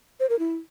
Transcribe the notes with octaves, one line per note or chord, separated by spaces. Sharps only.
C5
A#4
E4